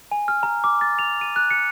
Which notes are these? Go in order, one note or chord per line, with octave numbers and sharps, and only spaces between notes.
G#5
F6
A#5
D6
A6
F7
D#7
F#6
C#7